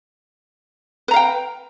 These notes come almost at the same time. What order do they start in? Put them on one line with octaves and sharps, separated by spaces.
B4 A#5 F5 G5